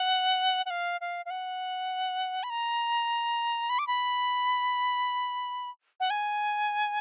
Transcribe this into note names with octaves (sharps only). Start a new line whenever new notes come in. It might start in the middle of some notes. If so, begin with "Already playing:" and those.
Already playing: F#5
F#5
F5
F5
F5
F#5
B5
A#5
B5
D6
B5
F#5
G#5